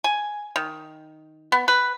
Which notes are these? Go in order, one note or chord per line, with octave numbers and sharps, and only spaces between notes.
G#5
D#3
B3
B4